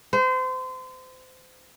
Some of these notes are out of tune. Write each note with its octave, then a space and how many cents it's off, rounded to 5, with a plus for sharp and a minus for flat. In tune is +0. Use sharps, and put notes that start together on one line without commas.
C5 -30